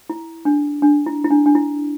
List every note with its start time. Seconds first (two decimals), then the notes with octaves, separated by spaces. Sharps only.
0.10 E4
0.45 D4
0.82 D4
1.06 E4
1.24 E4
1.30 D4
1.46 D4
1.55 E4